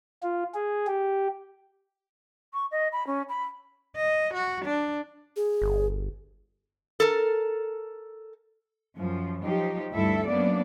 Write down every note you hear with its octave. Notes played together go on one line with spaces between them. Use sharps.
F4
G#4
G4
C#6
D#5
B5
C#4
B5
D#5
F#4
D4
G#4
G1
A4 A#4
F#2 F3
F3 F#3 D#4 G4
D2 G2 G3 E4 A4 E5
F#2 F#3 A#3 B3 D4 D5